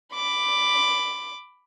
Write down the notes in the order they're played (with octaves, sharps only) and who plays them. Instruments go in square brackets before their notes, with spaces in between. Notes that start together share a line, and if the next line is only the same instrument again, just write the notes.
[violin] B5 D6